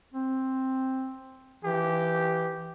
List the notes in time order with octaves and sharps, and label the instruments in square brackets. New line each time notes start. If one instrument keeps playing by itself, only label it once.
[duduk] C4
[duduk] E3 [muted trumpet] G4